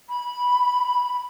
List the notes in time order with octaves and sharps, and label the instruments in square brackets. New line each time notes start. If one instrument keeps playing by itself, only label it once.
[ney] B5